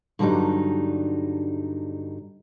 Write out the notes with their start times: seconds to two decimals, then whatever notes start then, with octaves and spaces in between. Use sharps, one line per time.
0.19 G2 D3 F#3 G3 D#4